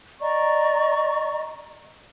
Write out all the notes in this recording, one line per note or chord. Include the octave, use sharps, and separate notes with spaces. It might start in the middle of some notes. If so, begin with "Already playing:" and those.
D5 D#5 A#5 C#6